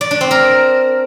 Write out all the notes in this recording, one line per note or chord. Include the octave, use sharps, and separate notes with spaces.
D5
D4
C4
A#4